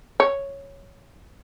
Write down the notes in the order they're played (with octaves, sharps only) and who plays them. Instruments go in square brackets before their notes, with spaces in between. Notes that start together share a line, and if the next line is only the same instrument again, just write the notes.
[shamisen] C#5